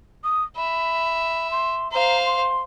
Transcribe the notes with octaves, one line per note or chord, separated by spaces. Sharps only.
D#6
E5 B5
C6
C5 F5 A#5
C6